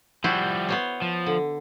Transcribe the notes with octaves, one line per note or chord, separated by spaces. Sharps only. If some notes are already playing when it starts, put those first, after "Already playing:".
F3 G3 E4 F#4 C5
B3 C5 C#5
F3
D3